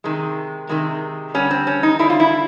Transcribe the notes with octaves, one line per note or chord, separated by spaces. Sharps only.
C3 D#3 G#3
C3 D#3 G#3
D3 G3 C#4
C4
C#4
D#4
D3 G3 E4
F4
E4